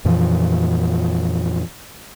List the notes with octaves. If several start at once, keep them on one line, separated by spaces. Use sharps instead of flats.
F2 A#2 E3 F3